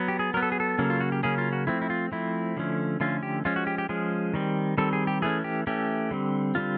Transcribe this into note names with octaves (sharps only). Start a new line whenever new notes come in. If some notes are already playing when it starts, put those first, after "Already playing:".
Already playing: F#3 B3
G4
G#4
F#3 B3 A#4
A4
G#4
A4
C#3 F#3 A#3 C#4
F4
F#4
G4
C#3 F#3 A#3 C#4 G#4
F4
F#4
F3 A3 C4 E4
E4
F4
F3 A3 C4 E4
D3 F3 A3 C#4
D3 F3 A3 C#4 F4
G4
F3 G#3 C#4 F4
F#4
G4
G4
F3 G#3 C#4 G#4
D#3 G3 C4
D#3 G3 C4 A4
G#4
G4
E3 A3 C#4 G#4
G4
E3 A3 C#4 G4
D3 G3 C4
D3 G3 C4 F4